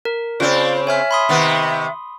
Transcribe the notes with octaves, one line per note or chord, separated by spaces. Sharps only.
A#4
C#3 C4 F4 C5 D5
C#5 E5 G#5 F6
B5 C6 D#6
C3 D#3 B3